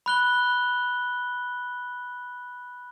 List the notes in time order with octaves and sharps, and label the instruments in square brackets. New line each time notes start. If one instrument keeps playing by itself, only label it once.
[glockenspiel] B5 F#6 G7